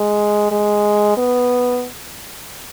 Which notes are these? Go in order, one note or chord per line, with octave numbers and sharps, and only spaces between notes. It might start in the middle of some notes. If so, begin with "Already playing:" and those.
Already playing: G#3
G#3
B3